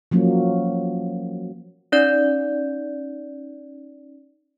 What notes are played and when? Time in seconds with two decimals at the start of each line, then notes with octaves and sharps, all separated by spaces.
0.11 F3 F#3 A#3 C#4
1.92 C#4 D#4 D5 G6